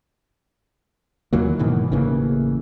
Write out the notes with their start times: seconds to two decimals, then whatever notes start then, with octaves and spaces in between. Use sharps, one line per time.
1.33 D#2 E3 F#3 A#3
1.59 G#2 B2 D#3 E3
1.92 A1 C#3 E3 A#3